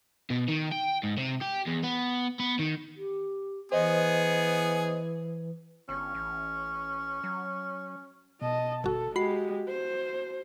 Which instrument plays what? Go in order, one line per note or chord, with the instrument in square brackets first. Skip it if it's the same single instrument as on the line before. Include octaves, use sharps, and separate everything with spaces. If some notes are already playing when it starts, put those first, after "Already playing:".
[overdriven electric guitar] B2
D#3
G5
G#2
C3
G4
E2
B3
B3
D#3
[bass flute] G4
[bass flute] E3 [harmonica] B3 G#4 [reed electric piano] C5 D#5
[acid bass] G1 [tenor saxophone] C#4
[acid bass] A1
F#3
[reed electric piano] B2 [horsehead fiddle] D#5 A5
[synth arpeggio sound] G1 F#4 [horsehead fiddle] A4
[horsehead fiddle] G#3 G4 [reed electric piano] F#4 [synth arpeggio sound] B5 C7
[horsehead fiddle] C5